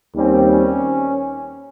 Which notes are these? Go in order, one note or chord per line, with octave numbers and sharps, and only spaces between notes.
D#2 D#3 G3 C4 C#4
C#4